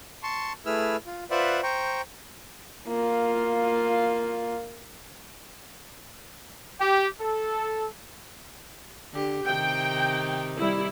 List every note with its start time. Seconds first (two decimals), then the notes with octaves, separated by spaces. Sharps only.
0.23 A5 C6 C#6
0.66 A3 E4 G#4 B4 E6 F6
1.06 F4
1.31 F4 B4 C5 D5 E5 F#5
1.63 C5 G5 A#5 C#6
2.87 A#3 F4
6.78 G4
7.21 A4
9.13 D3 G4
9.45 C3 D#3 G5
10.60 G3 E4